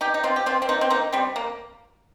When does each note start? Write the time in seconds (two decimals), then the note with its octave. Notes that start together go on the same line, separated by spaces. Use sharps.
0.01 D#4 G4
0.14 D#4
0.23 C4 F4
0.36 G4
0.46 C4 F4
0.62 C4
0.69 A#3 D#4
0.81 C4
0.90 A#3 D#4
1.12 G3 C4
1.36 A#3